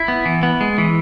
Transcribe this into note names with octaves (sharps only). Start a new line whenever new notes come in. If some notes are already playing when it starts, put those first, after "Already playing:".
Already playing: E4
B3
E3
B3
G#3
E3